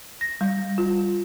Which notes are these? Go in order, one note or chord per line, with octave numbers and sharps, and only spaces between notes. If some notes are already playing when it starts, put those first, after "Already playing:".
A#6
G3
F4